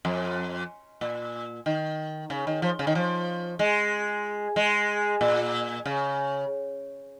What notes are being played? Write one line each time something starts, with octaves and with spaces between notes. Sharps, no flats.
F2
A#2
D#3
C#3
D#3
F3
C#3
D#3
F3
G#3
G#3
A#2
C#3